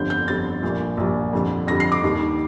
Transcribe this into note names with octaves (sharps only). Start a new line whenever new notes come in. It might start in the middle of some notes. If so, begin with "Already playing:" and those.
Already playing: G1 F2 D3 G3 G6
G6
G1 F2 D3 G3 A6
A#1 A#2 G3
A#1 A#2 G3
F2 D3 G3
F2 D3 G3 A#6
C7
D6
D#2 D#3 G3